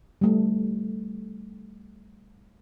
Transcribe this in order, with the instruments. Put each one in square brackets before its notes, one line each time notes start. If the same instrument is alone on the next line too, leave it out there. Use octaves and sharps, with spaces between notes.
[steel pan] G3 A3